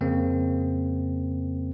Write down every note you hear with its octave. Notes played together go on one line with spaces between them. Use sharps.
F2 C#3 A#3 C4